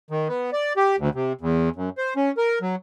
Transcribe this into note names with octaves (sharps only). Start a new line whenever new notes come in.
D#3
B3
D5
G4
D2
C3
E2
F#2
C5
C#4
A#4
F#3